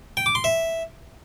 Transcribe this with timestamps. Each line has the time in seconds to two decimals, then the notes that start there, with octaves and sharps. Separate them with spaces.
0.17 G5
0.26 D6
0.35 C6
0.44 E5